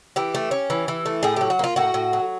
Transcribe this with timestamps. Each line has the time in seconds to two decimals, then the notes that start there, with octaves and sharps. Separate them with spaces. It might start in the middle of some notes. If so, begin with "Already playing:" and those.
0.16 E3 G4
0.35 A3
0.51 C#4
0.70 E3
0.88 E3
1.06 A3
1.23 A2 G#4
1.36 F#3 G4
1.50 F#4
1.59 A#3 F4
1.76 A2 F#4
1.94 A2
2.13 F#3